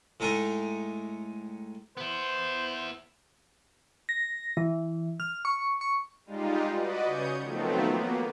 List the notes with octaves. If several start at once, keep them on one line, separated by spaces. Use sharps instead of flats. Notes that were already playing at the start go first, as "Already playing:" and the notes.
A2 G#3 D#4 A4 A#4
B3 E4 C5
A#6
E3
F6
C#6
C#6
G3 G#3 D#4 F4
F#4 B4 D5 D#5
C#3 C#4 D#6 G6 G#6 C#7
D#3 F3 F#3 A3 B3 C4
A#3 B3